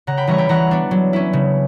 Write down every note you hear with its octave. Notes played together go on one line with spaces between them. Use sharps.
C#3 F#5 A#5
G5 B5
E3 G3 C#4 A#5 C#6
G5 B5
E3 F#5 A#5
B3 D4
F#3
C#4 E4
C#3